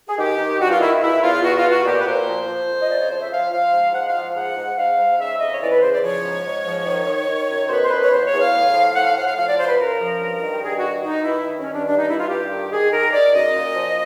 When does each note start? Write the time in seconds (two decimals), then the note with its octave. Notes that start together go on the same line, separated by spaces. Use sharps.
0.07 G#4
0.18 D#3 G4
0.38 D#3
0.60 G2 F#4
0.70 F4
0.80 D#3 E4
1.02 E2 E4
1.22 E2 F4
1.43 B2 F#4
1.56 F4
1.64 B2
1.71 F#4
1.85 A#2 G4
2.00 B4
2.06 A#2 C5
2.27 F3
2.48 F3
2.68 F2
2.81 D#5
2.89 C#3 D5
3.00 C#5
3.10 F3 C5
3.21 E5
3.31 F3 F5
3.51 F3 F5
3.73 G#2
3.93 F3 F#5
4.08 F5
4.15 F3
4.31 F5
4.35 G#2 F#5
4.57 G#2
4.77 G#2 F5
4.99 G#2
5.19 C#3 E5
5.39 F2 D#5
5.53 C#5
5.61 E3 D5
5.71 B4
5.82 C#3 C5
5.93 D5
6.02 F3 C#5
6.24 G#2
6.45 G#2
6.65 F3
6.86 D#3
7.07 D#3
7.28 D#3
7.49 F#2
7.66 C5
7.69 B2 B4
7.83 C5
7.91 B2 B4
8.03 C#5
8.12 E2 C5
8.25 C#5
8.32 E2
8.39 F5
8.53 A2
8.74 F3
8.95 A2 F#5
9.05 F5
9.16 A2 F#5
9.26 F5
9.37 F3 F5
9.47 D5
9.58 C#3 C5
9.68 B4
9.78 F#2 A#4
9.99 F3
10.20 G2
10.42 D#3
10.52 G4
10.62 G2 G#4
10.71 G4
10.77 F#4
10.83 D#3
11.03 D#3 D#4
11.24 G2 E4
11.46 D#3
11.60 C#4
11.67 G2
11.73 D4
11.87 G2 D4
11.98 D#4
12.09 G2 E4
12.19 F4
12.29 G2 G4
12.51 D#3
12.71 D#3 G#4
12.92 D#3 A#4
13.12 D#3 D5
13.33 F#2 D#5
13.55 A#2
13.75 F3